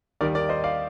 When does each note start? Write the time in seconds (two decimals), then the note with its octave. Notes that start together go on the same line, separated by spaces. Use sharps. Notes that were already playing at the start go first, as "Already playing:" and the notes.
0.21 D#2 D#3 G3 A#4 D5
0.35 A#4 D5
0.49 C5 D#5
0.64 D5 F5